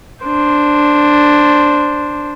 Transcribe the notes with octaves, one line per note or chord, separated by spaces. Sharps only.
D4 C5